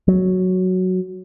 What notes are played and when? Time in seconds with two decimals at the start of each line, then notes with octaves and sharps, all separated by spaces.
0.08 F#3